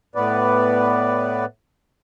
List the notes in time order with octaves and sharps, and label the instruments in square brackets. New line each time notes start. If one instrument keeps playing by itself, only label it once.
[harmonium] A2 B3 B4 D5